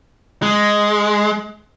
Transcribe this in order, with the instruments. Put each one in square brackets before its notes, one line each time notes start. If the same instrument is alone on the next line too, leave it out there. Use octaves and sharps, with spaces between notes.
[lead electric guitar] G#3